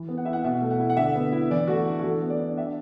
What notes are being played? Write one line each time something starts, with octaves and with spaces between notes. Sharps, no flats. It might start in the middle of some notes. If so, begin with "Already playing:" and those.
Already playing: E3
B3
F#5
E4 E5
F#5
B2 E5
A3
F#5
E4
F#5
D3 E5
B3
E4
E3 D5
A3 F#4
A4
D4
F#4
E3 A4
B3
D5
D4
D4 E5